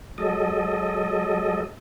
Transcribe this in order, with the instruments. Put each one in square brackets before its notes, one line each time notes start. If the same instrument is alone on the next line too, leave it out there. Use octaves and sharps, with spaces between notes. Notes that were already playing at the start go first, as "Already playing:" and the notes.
[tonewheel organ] F#3 G#3 A4 D#5